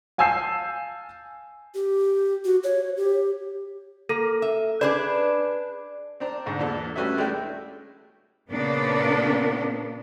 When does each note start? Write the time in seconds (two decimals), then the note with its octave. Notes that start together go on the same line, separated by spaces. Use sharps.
0.18 F5 G#5 A5 E6 G6 C7
1.75 G4
2.45 F#4
2.63 C#5
2.97 G4
4.09 A#3 A4
4.42 E5
4.81 D4 G#4 B4 D5
6.20 C4 D4 A#5
6.46 G#2 D3
6.59 E2 A#2 D4 A4
6.96 G3 A3 C#4 F#4 B4 E5
7.17 G#3 A3 D4 E4 G5
8.50 A#2 C#3 A#3 B3 D4